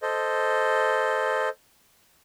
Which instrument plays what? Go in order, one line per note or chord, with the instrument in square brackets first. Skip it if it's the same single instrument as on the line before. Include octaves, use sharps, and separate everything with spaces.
[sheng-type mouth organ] A4 C5 D#5